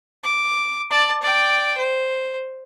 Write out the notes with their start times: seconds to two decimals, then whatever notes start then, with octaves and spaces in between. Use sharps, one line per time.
0.24 D6
0.91 D5 A5
1.22 D5 G5
1.77 C5